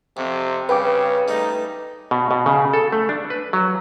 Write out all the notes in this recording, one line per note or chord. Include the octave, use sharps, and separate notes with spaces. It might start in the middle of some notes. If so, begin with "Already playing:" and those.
F2 C3
G2 C#3 B4 G5 D6
G3 A3 D#4
B2
B2
C#3
A4
A3
D4
B4
F#3